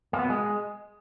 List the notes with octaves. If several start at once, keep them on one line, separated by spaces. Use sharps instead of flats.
A#3
B3
B2
G#3